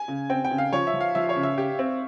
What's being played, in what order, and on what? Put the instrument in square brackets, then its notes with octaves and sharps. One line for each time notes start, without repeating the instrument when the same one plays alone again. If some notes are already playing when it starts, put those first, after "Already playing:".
Already playing: [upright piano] G#5
[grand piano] C#3
[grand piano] C4 [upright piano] G5
[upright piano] G5
[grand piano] C#3
[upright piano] F5
[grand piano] F3 [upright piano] C#5
[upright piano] E5
[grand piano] F3
[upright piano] F5
[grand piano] F3 [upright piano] E5
[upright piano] C#5
[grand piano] C#3
[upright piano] E5
[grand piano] G4
C4